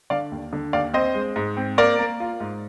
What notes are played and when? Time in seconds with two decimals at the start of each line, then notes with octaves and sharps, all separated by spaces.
0.10 D3 D5 F5
0.32 D#2
0.53 D3
0.73 D#2 D5 F5
0.94 C4 C5 D#5
1.15 G#3
1.36 G#2
1.57 C4
1.78 A#3 A#4 D5
1.99 A#3
2.20 F4
2.40 G#2